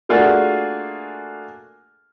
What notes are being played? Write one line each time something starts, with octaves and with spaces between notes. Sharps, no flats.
A3 A#3 D4 F4 F#4 G#4